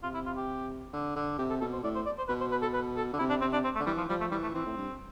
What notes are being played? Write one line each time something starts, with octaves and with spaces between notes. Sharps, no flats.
C3 F4
E4
F4
G4
D3
D3
C3 G4
A4
B2 A4
C5
A2 D5
C5
D5
C5
B2 B4
C5
B4
A4
B4
A4
D3
C3 E4
D4
C3 C4
D4
C4
A3
D3
E3 G3
F3
F3 G3
A3
E3 G3
A3
E3 C4
A2
G2